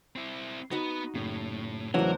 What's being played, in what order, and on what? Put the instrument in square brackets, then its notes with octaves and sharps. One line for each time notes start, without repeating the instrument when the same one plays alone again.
[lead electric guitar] C4 E4
[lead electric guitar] B3 B4 [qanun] D#4 F#4 D#5
[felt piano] F#1 [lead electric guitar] A2
[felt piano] E2 A2 C#3 [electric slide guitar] E3 F#3 [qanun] D4 C5 [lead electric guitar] A#4